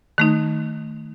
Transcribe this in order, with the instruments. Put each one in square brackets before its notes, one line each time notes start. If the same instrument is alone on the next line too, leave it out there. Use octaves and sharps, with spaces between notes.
[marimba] D#3 A3 D#4